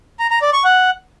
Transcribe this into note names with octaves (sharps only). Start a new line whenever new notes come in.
A#5
A#5
D5
C#6
F#5